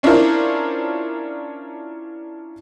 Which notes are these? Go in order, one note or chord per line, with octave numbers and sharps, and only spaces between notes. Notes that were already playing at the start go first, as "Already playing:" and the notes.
C#4 D4 E4 F4 A#4 C5